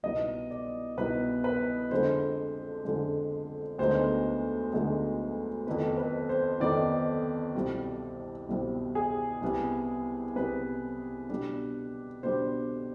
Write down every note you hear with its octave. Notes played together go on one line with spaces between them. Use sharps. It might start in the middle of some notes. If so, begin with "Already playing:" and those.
C2 B2 B3 D#4 D#5
D5
C2 B2 B3 D#4 B4
B4
F2 D3 F3 G#3 C5
F2 D3 F3 G#3
D2 D3 G#3 B3 D#4 C5
D2 D3 G#3 B3 D#4
F2 D#3 B3 D#4 B4
B4
C5
F2 D#3 B3 D#4 D5
C2 B2 G3 C4
C2 B2 G3 C4
G#4
C2 C3 G3 B3
C2 C3 G3 B3 B4
B2 G3 D4
B2 G3 D4 C5